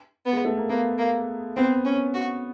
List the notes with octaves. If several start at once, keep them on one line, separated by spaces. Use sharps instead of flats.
B3
G#3
A3
A#3
A#3 B3
A#3
B3 C4
C#4
F#4